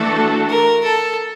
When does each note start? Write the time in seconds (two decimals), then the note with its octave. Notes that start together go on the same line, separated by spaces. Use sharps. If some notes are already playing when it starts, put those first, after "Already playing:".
Already playing: E3 A3 D4 F#4 A4
0.49 A#4
0.84 A4